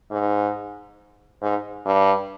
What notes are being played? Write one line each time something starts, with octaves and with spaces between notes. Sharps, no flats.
G#2
G#2
G2